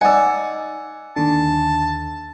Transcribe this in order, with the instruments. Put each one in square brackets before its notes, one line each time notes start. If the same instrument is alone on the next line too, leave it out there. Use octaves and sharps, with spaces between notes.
[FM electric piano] D#4 [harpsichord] D5 F#5 [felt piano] G#5 E6
[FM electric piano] D#2 D3 [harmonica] A5